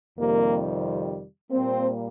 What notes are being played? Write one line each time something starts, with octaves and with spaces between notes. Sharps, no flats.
F2 C3 D#3 G3 A#3
A#2 G3 A#3 C4